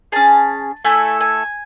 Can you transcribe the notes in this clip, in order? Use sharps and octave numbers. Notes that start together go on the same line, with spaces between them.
C#4 G#4 A5
A3 E4 A4 G#5
G#5